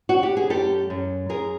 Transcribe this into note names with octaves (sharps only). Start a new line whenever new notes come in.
F#4
G4
G#4
F#2 G4 A4
F#2
F#2 G#4 A#4